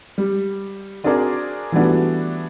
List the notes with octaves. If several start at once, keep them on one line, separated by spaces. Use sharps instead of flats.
G3
C4 D4 F#4 G#4 A#4 D5
E3 G3 A3 B3 D4 F#4